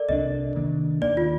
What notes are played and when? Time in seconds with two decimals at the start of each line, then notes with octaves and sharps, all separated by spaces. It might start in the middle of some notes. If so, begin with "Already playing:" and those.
Already playing: A4 A#4 D5
0.09 C2 C3 G3 D4 D#5
0.55 C3 D#3 A#3 D4
1.01 D#2 D#3 A#3 D5
1.17 F4